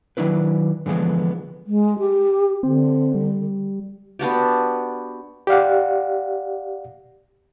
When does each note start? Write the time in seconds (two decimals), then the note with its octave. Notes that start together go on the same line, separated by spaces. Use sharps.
0.17 D#3 F#3 D4 E4 B4
0.86 D3 E3 F3 G#3 B3
1.67 G#3
1.99 G4
2.63 D3 C4
3.15 G3
4.19 B3 D4 F#4 G4
5.47 G4 D5 F5 F#5